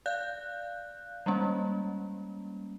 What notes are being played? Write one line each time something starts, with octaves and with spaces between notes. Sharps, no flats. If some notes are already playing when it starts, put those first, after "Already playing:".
D5 F5 F#6 G6
G3 G#3 A#3 C#4